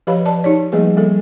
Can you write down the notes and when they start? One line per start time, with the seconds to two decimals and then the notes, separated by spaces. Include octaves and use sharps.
0.07 F3 G4 B4 C#5 F5 B5
0.25 B4 D5 A5
0.43 D#4 G4 C#5 D5
0.72 F3 G3 A3 A#3 G#4 B4
0.96 G3 A#3 A4